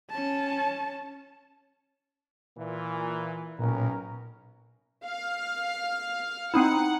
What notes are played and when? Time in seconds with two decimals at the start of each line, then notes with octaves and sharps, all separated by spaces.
0.10 C#4 A5
2.58 A#2 E3
3.59 B1 A#2 C#4 A#4
5.05 F5
6.54 C4 D#4 E4 F#5